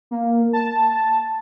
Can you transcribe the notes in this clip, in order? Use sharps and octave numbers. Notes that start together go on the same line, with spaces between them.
A#3
A5